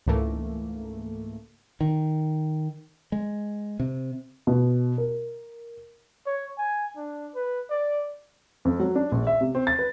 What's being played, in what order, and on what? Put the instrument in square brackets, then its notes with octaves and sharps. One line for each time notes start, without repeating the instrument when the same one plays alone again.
[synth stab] C#2 G#2 E3 A3 A#3
[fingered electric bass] D#3
G#3
C3
[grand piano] B2
A#4
[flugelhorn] C#5
G#5
D4
B4
D5
[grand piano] F2
F#3
D4
A#1
E5
C3
C4
A6
B4